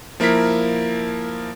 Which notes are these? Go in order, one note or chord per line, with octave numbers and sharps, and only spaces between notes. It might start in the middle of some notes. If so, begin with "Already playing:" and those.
F3 A#3 E4 A#4 B6